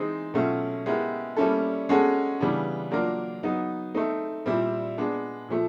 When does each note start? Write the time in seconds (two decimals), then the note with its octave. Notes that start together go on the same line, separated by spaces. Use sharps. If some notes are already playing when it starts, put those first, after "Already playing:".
Already playing: E3 G#3 C4 D#4
0.34 B2 F#3 A3 C#4 F4
0.86 G#3 B3 E4 G4 A#4
1.37 G3 A#3 C#4 E4 A4
1.89 G#3 C#4 F#4 A4
2.41 C#3 E3 G3 B3 D4
2.91 F#3 A#3 D4 F4 A#4
3.43 F#3 B3 D#4
3.95 A3 C4 D#4
4.46 A#2 G3 C4 E4
4.98 G#3 B3 D4
5.48 A#2 F3 A3